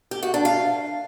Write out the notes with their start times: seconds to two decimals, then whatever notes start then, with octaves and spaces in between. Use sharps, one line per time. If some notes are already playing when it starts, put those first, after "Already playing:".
0.11 G4
0.23 F#4
0.34 D4
0.45 F5